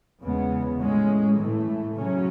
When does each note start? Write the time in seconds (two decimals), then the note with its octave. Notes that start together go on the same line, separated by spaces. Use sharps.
0.21 E2 C#3 G#3 B3
0.79 A2 G#3 C#4
1.38 A2 E3 A3
1.96 C#3 F#3 C#4